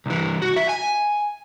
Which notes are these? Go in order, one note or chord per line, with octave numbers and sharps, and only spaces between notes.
C2 E3
F#4
E5
G#5